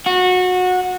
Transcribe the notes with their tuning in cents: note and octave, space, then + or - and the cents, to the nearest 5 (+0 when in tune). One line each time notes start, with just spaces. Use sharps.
F#4 -20